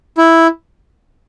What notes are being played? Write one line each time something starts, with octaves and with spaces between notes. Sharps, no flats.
E4